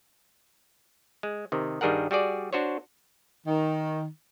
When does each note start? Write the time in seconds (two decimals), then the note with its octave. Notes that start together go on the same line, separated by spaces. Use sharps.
1.23 G#3
1.52 C3 D#3
1.81 G2 D#3 G3 G#4 A#4 F#5
2.11 G3 F#4 G#4 D5
2.53 D4 F#4 C5 C#5
3.47 D#3